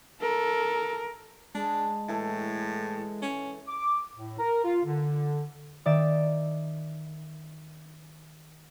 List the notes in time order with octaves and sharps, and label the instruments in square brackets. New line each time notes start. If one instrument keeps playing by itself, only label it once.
[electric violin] A4 [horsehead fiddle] A#4
[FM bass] G#3 [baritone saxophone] D4 [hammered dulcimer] A5
[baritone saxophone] A2 [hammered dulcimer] E3 A4
[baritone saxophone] C#4
[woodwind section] D6
A2
A#4
F4
D3
[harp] D#3 D5 E5